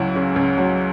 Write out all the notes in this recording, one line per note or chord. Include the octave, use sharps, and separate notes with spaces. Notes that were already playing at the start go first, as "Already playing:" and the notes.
Already playing: C#2 F#3 E4 F#4
C#3
C#2
F#3